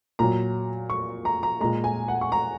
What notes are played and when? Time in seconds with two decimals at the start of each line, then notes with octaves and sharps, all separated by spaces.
0.19 A#2 F#3 A#5
0.90 C#6
1.25 A#5
1.43 A#5
1.60 A#2 G#3 A#5
1.84 G#5
2.08 F#5
2.21 C#6
2.32 A#5